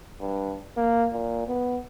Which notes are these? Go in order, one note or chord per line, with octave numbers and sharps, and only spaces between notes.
G2
A#3
A#2
B3